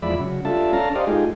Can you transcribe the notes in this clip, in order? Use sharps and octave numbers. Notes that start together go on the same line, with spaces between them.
E2 F3 G#3 D5 E5 B5
C#3 F#3
G3 D4 F4 A4 E5 A5
C#4 D4 A4 F5 A5 A#5
G4 C5 D5 D#5 F5
G#3 A3 D#4 F4 G4 G#4